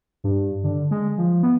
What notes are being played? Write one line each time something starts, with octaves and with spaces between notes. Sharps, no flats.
G2
D3
G#3
F3
B3